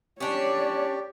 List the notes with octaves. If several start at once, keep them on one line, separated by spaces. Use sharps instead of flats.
C#4 D4 G4 C#5 D5